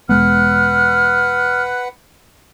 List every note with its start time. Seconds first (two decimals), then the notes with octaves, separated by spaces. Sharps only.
0.09 E1 G#3 B3 B4 F#5 F6